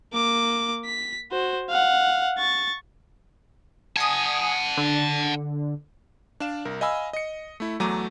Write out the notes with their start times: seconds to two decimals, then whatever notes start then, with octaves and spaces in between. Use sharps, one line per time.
0.13 A#3 D6
0.85 B6
1.32 F#4 C5
1.69 F5 F#5
2.38 C#6 A6
3.97 F#5 G#5 A5 D#6
4.77 D3
6.40 D4 D5 F5 E7
6.65 C2 A#4
6.81 D#5 F5 G#5 B5 E6
7.13 D#5 C#7
7.60 A3 E4
7.80 E2 F#3 A3 A#5 D6 D#7